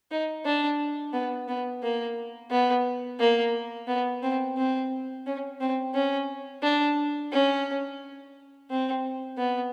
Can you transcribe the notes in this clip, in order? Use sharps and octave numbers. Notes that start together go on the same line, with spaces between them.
D#4
D4
B3
B3
A#3
B3
A#3
B3
C4
C4
C#4
C4
C#4
D4
C#4
C4
B3